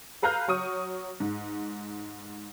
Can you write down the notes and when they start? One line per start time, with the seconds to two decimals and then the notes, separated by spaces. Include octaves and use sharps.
0.22 A4 B4 F5 A#5 F6 G6
0.48 F#3 C#6 D#6
1.20 G#2